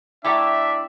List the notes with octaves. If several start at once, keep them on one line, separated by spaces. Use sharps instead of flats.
F#3 A3 D4 E4 G4 E5